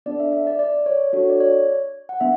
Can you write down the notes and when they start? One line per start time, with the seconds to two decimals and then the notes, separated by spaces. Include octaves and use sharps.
0.06 B3 D4 A4 D5
0.20 E5
0.33 E5
0.47 D5
0.59 D5
0.86 C#5
1.13 D4 F#4 A4 C#5
1.30 D5
1.40 C#5
2.09 F#5
2.20 B3 D4 E5